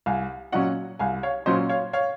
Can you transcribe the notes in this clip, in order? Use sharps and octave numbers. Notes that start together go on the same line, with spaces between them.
C2 F5 G#5
A#2 F#3 C#4 D#5 F#5
C2 F5 G#5
C#5 F5
A#2 F#3 C#4 C5 D#5
C#5 F5
C#5 F5